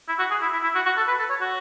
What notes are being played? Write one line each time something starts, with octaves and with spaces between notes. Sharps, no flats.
E4
F#4
G#4
E4
E4
E4
F#4
F#4
A4
B4
A4
C#5
F#4